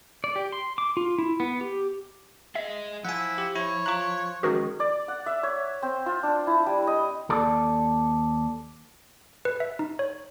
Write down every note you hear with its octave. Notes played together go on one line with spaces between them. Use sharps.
D5
G4
C6
D6
F4
E4
B3
G4
G#4 D#5 E5
F3 E4 F#5 G#5
G4
E4 C#5
F4 A#5 C#6 F#6
D#3 G#3 C#4 F#4 G#4 A#4
D5
F#5
E5
C#5
C4
F4
D4
E4
G3
D#5
D#2 A4 D5
B4
E5
D#4
C#5